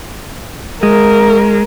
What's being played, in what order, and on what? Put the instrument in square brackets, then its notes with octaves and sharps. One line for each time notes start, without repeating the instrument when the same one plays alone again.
[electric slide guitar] G#3 [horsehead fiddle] A#4